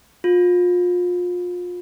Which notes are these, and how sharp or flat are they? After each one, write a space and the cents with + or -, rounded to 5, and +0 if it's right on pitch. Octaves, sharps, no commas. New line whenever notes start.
F4 +30